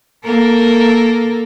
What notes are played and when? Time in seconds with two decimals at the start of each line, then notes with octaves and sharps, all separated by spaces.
0.25 A#3 A4 A#4